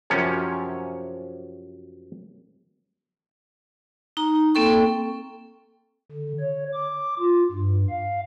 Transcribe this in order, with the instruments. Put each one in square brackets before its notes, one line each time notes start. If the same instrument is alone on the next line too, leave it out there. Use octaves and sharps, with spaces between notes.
[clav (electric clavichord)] F#2 C3 F3 C#4 C#5
[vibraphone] D#4 A#5
A#3 C4 A4 G5 C#6
[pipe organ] D3
C#5
D6
F4
G2
F5